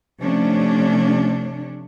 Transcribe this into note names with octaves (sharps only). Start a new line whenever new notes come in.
C3 F3 A3 C#4 D4